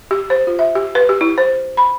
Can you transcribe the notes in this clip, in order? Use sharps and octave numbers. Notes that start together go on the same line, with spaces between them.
G4
C5
F4
E5
G4
B4
G4
E4
C5
B5